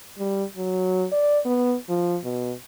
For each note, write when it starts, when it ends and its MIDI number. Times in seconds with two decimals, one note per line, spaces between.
0.18 0.44 55
0.57 1.07 54
1.12 1.39 74
1.45 1.75 59
1.89 2.18 53
2.24 2.53 47